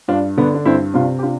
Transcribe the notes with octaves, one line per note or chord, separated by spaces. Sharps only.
G2 D4 F4
D3 B3 D4
D4
G2 C4 E4
C3 D4 F4
G4
D4 F4